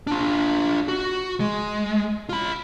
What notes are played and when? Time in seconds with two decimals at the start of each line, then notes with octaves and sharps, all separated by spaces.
0.07 D4 F4
0.88 F#4
1.40 G#3
2.29 F4 B5